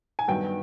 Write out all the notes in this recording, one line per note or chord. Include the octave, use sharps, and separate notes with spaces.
G#5
G2 D#3 F#3 B3 G5